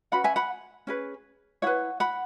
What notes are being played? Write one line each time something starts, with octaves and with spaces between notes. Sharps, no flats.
C#4 F#4 B4 F#5 B5
E5 G#5
F#5 B5
C#4 G#4 B4
E4 B4 C#5 F#5
F#5 B5